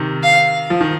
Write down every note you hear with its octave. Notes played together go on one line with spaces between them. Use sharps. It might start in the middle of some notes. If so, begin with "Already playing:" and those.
Already playing: C3 D#3
F5
F3
D#3